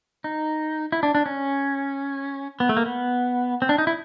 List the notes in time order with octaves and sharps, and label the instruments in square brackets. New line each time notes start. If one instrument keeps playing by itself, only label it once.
[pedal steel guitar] D#4
E4
D4
D4
C#4
B3
A3
A#3
B3
C4
D4
D#4
E4